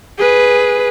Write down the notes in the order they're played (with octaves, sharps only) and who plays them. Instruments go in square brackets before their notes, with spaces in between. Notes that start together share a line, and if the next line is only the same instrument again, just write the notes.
[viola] G#4 B4